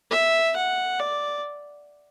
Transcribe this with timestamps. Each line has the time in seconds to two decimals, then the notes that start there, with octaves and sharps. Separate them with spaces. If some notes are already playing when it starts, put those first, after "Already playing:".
0.11 E5
0.56 F#5
1.00 D5